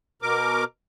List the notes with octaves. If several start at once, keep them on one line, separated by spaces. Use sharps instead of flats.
B2 A#4 D6